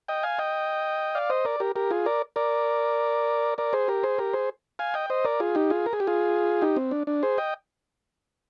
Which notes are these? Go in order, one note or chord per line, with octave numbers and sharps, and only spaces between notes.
D#5 G5
F5 G#5
D#5 G5
D5 F5
C5 D#5
A#4 D5
G4 A#4
G4 A#4
F4 G#4
A#4 D5
A#4 D5
A#4 D5
G#4 C5
G4 A#4
G#4 C5
G4 A#4
G#4 C5
F5 G#5
D#5 G5
C5 D#5
A#4 D5
F4 G#4
D#4 G4
F4 G#4
A#4
G#4
G4
F4 G#4
D#4 G4
C4
D4
D4
G#4 C5
D#5 G5